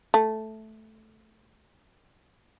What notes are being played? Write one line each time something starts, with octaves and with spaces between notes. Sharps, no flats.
A3